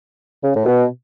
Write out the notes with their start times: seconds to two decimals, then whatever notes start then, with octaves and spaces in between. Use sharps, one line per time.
0.44 C#3
0.55 A2
0.66 B2